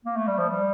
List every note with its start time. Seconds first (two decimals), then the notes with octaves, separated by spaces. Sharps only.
0.05 A#3
0.16 A3
0.27 G3
0.38 F3
0.50 G3